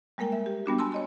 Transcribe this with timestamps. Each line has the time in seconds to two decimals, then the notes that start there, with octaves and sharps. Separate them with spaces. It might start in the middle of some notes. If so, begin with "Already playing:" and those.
0.18 G3 G#3 A#3 A#4 G5
0.32 E5
0.46 G4
0.66 G3 B3 D4 F#4
0.79 G#5 A5 C6 E6
0.92 C#5 D#5 C6